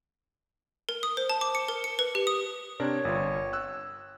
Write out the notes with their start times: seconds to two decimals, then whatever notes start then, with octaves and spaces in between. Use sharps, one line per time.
0.89 A#4
1.03 D#6
1.17 C5
1.30 A5
1.41 D6
1.55 C#7
1.68 A#4
1.84 C#7
1.99 B4
2.15 G4
2.27 D#6
2.80 C3 D4 A#4 C#5
3.05 G1 F4
3.53 E6 F#6